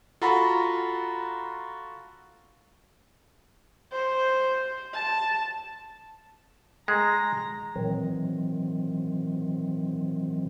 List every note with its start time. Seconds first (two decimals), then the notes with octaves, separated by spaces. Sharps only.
0.22 F4 F#4 A4 F#5 A#5 B5
3.92 C5
4.93 A5
6.88 G#3 A#5
7.76 A#2 D#3 E3 F#3 C4